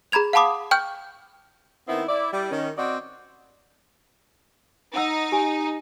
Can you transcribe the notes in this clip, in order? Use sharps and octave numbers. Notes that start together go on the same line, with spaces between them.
G#4 A#5 B5 G#6 F7
F5 F#5 A5 B5 D6 D#6
G5 C#6 F6 G6
D#3 B3 C4 E4
E4 D5
G3 E4
D#3 C#4
C4 F#4 D5 D#5
D#4 F#5 E6
G4 G#5